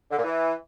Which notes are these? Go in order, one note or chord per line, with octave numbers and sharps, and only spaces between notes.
D3
A#2
E3